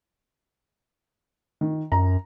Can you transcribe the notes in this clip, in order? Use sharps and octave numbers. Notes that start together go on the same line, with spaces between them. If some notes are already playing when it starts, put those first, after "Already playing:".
D#3
F#2 A#5